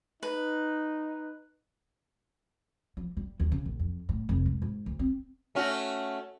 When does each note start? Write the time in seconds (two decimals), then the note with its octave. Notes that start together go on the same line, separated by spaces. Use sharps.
0.23 D#4 B4
2.97 F3
3.17 G3
3.40 D#2
3.52 C#3
3.66 A#1
3.80 F2
4.09 A2
4.29 F1
4.46 G#3
4.62 G#2
4.86 D2
4.99 C4
5.55 A3 C#4 F#4